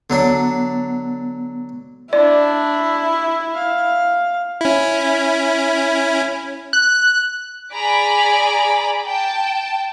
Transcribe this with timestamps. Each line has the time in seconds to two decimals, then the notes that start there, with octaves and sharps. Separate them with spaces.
0.10 D3 F#3 B3 D4
2.13 D4 E4 D5
3.55 F5
4.61 C#4 E4
6.73 F#6
7.72 G#4 D5 G#5 A#5 B5 D6
9.03 G5 A5